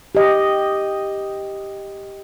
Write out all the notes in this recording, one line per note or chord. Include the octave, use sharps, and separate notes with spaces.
G4 D#5